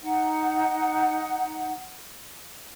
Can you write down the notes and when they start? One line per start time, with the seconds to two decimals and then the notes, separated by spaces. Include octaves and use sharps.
0.01 D#4 F#5